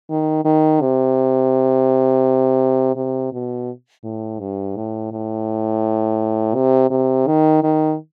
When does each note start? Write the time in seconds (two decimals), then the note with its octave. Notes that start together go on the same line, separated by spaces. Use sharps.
0.10 D#3
0.45 D#3
0.81 C3
2.96 C3
3.33 B2
4.04 A2
4.39 G2
4.76 A2
5.12 A2
6.55 C3
6.90 C3
7.27 D#3
7.63 D#3